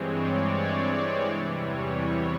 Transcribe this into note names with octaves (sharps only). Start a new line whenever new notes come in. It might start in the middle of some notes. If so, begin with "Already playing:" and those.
Already playing: G2 E3 G#3 C4 C#5
D5
C#5
E2 C3 E3 G3 C5
C#5
C#5